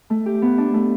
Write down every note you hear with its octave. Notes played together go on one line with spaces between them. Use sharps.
A3
G4
B3
D4
A3